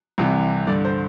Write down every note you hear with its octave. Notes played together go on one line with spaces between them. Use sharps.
C2 C3 E3
G2 D3 D5
C5